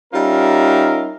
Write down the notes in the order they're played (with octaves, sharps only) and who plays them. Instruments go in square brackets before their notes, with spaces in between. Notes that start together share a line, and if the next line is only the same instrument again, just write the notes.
[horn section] G3 C#4 D#4 F4 A#4 E5